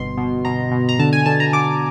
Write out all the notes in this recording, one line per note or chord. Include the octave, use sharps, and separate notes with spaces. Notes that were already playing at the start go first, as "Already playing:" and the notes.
Already playing: G1 B2 C6
B2
B2 A#5
B2
A#5
D3 A5
G#5
D3 A5
A#5
D3 D6